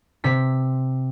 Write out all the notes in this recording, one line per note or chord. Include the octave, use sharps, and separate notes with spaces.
C3 B6